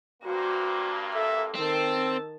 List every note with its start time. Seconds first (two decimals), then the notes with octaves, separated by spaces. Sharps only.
0.23 G2 A#3 F#4 C5
1.14 A4 E5
1.55 D#3 C4 A5 E6